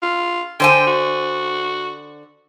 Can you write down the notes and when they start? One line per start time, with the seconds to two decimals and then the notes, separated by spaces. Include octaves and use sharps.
0.02 F4
0.60 D3 C5 G5 G#5
0.87 F#4